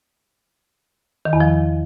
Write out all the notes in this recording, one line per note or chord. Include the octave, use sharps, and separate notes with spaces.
D#3
E2
F3